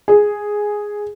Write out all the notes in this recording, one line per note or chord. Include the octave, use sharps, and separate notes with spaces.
G#4